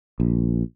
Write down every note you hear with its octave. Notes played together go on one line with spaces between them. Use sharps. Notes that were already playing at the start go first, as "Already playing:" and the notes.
A#1